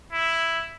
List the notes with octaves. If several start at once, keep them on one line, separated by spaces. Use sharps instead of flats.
E4